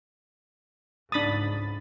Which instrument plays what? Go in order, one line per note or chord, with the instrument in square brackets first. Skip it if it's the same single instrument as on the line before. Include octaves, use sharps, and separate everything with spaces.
[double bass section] C#2 G#2 [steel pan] D4 D#6 [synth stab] B5 A6